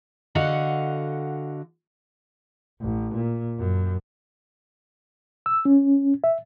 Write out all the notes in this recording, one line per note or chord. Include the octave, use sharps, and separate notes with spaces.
D3 F#4 D#5 F5 F#5
A1
A#2
F#2
E6
C#4
E5